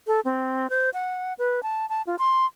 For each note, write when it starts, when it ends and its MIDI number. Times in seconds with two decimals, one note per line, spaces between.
0.07 0.20 69
0.25 0.70 60
0.70 0.90 72
0.94 1.34 78
1.39 1.63 71
1.63 1.88 81
1.89 2.02 81
2.07 2.16 65
2.19 2.46 84